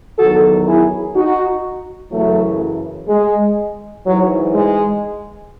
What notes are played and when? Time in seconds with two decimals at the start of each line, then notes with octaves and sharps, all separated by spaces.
0.18 E2 D#3 F#3 F#4 A4
0.66 E4 G#4
1.15 D#4 F#4
2.12 F#2 C#3 E3 F#3 A3
3.08 G#3
4.06 G#2 E3 F#3
4.54 G#3